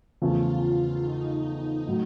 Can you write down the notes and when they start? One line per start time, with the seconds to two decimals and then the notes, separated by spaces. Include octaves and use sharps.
0.21 E2 C#3 F3 A3 F4
1.03 D#4
1.88 A2 F#3